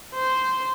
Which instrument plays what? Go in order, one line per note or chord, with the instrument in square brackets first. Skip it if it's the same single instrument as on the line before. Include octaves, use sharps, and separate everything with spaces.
[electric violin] C5